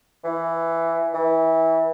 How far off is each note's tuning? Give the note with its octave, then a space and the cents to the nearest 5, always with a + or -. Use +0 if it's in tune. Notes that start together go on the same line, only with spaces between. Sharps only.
E3 +10
E3 -20